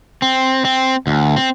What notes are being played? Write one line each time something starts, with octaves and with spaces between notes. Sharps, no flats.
C4
C4
D2
C4